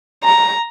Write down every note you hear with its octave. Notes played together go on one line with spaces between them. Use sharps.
A#5